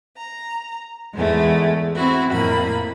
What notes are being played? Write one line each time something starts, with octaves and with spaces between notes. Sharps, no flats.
A#5
E2 G#2 G#3 A3
C4 E4 F#4
F2 A2 A#3 B5